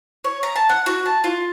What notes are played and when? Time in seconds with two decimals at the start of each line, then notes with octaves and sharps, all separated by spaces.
0.24 C#5
0.43 A#5
0.56 A5
0.69 F#5
0.86 F#4
1.06 A5
1.24 F4